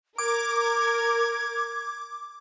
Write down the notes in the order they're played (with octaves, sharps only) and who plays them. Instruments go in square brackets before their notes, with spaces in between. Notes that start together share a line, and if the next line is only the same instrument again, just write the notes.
[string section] A#4 [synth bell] D6 [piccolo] G#6